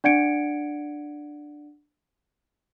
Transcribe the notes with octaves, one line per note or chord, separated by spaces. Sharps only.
D4 D5 F#5 G#6 C#7 D7